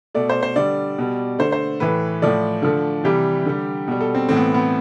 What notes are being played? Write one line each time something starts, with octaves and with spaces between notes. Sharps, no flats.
B2 A3 D5
C5
C5
D3 G3 D5
B2 G3
D3 A3 C5
C5
A2 E3 A3 B4
A2 F3 A3 D5
D3 F3 A3
C3 E3 G3 G4
D3 G3
B2 G3
A4
C4
A2 E3 A3 C4
B3
B3